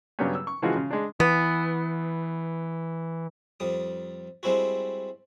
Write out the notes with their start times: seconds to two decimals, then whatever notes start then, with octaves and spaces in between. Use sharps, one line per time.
0.19 G2 C#3 F#3 G3 B3 C#4
0.35 E6
0.47 C#6
0.62 C#3 E3 F3 G#3 F4 F#4
0.76 C#3
0.91 G#3 D4
1.20 E3 B3
3.60 F2 G3 D#6
4.43 G3 G#3 C4 E4 F#4